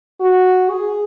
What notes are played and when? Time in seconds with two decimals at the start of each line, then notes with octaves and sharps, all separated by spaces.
0.21 F#4
0.71 G#4